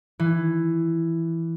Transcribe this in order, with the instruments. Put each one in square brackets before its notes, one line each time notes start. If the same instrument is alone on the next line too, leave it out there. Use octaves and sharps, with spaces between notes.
[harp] E3